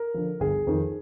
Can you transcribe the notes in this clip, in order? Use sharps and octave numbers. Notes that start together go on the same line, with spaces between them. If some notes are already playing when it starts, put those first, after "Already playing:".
Already playing: A#4
D3 F3
G1 G#4
F2 D#3